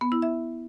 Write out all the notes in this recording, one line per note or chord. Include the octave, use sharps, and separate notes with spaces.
B3
E4
E5